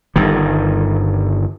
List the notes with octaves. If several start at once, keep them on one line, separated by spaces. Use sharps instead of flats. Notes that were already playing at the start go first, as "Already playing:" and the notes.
G1 G2 D#3